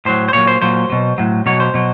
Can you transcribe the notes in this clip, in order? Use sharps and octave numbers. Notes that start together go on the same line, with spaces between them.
A2 F#3 C5
C5
A#2 F#3 C#5
C5
A#2 F#3 C5
B2 F#3
A2 F#3
B2 F#3 C#5
C5
B2 F#3